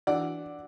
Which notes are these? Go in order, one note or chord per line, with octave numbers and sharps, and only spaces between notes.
E3 D4 D5 F#5